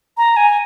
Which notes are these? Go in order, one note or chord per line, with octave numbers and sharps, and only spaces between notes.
A#5
G#5